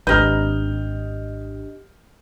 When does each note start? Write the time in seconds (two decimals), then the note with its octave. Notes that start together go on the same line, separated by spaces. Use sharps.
0.07 G#1 D4 G4 B4 D#5 A#5 F6 G6